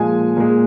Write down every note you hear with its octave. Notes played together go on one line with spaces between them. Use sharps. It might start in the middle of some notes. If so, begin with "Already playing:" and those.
Already playing: A#2 F3 G#3 G#5
A#2 G#3